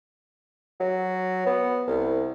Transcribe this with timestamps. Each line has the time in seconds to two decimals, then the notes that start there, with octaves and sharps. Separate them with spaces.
0.80 F#3
1.47 B3
1.88 C2